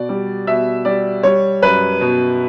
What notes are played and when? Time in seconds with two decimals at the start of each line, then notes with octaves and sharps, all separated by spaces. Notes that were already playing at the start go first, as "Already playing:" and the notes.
Already playing: B2 D5
0.09 G3
0.47 B2 E5
0.85 G3 D5
1.23 G3 C#5
1.62 F#2 B4
2.01 B2